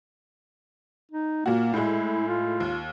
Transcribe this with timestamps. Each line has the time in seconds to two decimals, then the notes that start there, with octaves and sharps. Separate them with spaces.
1.11 D#4
1.46 A#2 A#3 F#4
1.74 A2 G#3 E4
2.27 F4
2.60 D#2